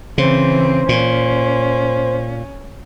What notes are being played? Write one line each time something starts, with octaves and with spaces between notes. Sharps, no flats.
C#3 E3 C4 C5
A#2 C#4